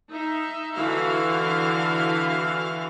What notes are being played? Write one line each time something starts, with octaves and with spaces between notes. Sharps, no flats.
D#4 E5
D3 E3 E4 F#4 F5